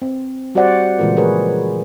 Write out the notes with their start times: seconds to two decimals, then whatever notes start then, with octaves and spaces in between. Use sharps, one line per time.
0.02 C4
0.55 G3 F#4 G4 C5 D5 F#5
0.98 A#2 C#3 E3 G#3 F4 A#4
1.16 F3 G#4 A#4 B4 C#5